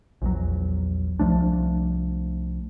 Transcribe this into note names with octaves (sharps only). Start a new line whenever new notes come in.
A#1 E2 F#3
C2 F3 A3 D4